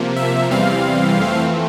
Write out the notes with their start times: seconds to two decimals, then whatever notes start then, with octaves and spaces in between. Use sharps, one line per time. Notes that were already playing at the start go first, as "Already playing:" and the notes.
Already playing: C3 F3 A#3
0.16 E5
0.50 E2 C3 E3 G3 C4 F5
1.17 F2 E3 A3 C4